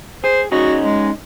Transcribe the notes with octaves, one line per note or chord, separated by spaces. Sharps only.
G#4 C5
C#4 D#4 F#4 G#4
G#3